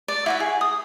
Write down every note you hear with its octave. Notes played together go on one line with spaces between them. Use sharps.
D5
E4 F#4 E5
G#4
D#6